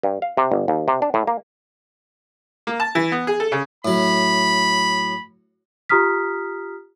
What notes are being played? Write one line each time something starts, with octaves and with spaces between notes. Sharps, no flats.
G2
F5
C3
G1
D#2
C3
D4
A2
A#3
A#3
A5
E3
B3
G#4
A4
C#3
A2 F#3 B5
F4 G4 A#5 D#6 F6 B6